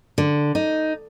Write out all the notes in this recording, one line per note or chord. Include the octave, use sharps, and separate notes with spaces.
D3
D#4